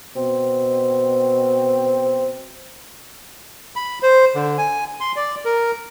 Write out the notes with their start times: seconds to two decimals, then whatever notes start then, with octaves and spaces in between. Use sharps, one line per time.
0.16 B2 C4
3.76 B5
4.03 C5
4.35 D3
4.58 G#5
5.00 C6
5.16 D5
5.45 A#4